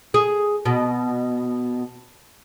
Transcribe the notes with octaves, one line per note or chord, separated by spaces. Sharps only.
G#4
B2